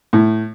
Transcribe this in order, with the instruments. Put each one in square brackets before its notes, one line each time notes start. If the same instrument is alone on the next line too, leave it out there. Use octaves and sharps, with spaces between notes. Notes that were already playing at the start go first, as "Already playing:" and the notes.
[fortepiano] A2